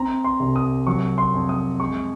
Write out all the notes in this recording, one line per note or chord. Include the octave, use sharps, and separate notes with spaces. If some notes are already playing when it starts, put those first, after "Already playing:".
Already playing: C4 A#5
C6
C2
D#6
F#3 C#6
C6
F2
D#6
G#3 C#6